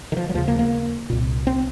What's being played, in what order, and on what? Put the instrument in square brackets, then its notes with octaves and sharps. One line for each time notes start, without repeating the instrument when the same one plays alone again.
[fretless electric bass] D#3
F3
F#3
D#2 C#3 F3
A#3
A#3
C2 A#2
C4